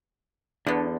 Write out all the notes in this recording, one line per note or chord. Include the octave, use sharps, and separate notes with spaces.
E2 D3 B3 D4